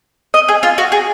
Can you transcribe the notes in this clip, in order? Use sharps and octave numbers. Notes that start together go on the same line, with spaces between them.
D#5
G#4
F4
F#4
G#4